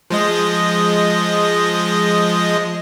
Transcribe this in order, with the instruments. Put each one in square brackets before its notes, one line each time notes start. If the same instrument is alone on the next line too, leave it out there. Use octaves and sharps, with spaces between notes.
[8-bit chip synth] F3 G#3 D#5